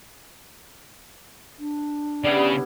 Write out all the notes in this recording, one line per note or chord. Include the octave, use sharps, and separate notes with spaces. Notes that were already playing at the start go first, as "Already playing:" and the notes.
D4
C#3 G3 B3 E4 D5